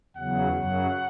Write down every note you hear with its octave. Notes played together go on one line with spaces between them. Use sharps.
E2 C#3 F#3 F#5
F#2 C#3 F#3